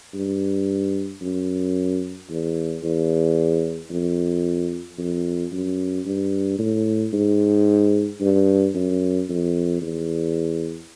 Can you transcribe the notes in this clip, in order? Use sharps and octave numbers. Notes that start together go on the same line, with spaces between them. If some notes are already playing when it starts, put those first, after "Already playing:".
G2
F#2
E2
E2
F2
F2
F#2
G2
A2
G#2
G2
F#2
F2
E2